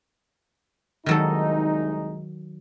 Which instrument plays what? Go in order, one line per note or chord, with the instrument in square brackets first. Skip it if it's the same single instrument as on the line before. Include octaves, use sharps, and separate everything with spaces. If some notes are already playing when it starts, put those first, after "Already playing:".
[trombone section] C2 G#3 D#4 [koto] D#3 F#3 A4